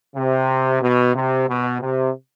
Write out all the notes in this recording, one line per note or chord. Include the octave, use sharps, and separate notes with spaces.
C3
B2
C3
B2
C3